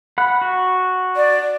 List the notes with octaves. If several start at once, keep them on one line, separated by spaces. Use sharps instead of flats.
F#5 B5 F#6
F#4
D5